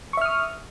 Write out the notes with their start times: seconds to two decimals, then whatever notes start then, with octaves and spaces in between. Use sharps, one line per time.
0.13 C#6
0.17 E5
0.21 F6
0.26 D#6